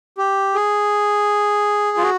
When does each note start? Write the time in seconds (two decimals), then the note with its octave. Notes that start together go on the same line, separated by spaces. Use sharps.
0.18 G4
0.55 G#4
1.97 F4
2.03 F#4